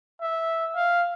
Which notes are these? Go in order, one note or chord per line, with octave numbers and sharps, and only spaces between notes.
E5
F5